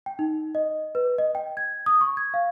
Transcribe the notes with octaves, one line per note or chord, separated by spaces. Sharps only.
G5
D#4
D#5
B4
D#5
G5
G#6
D#6
C#6
G#6
F5